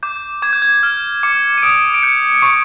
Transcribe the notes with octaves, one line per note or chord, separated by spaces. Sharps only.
D6 G6
D6 G#6
G6
G#6
F6
D6 C#7
D#7
D#6 D7
D7
G6 C#7
C#6 C#7